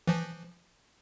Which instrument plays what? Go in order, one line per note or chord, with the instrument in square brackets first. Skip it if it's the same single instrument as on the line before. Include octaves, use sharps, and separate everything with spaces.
[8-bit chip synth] E3 F3